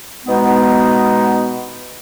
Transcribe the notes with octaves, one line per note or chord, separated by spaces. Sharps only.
B2 G#3 B3 D#4